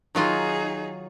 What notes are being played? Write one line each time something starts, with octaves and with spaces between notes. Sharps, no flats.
D#3 F#3 D#4 F4 G#4